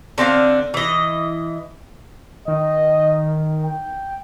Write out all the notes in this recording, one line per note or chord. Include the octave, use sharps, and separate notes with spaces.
D3 C4 D4 F5
E3 D#5
D#3 D#5
G5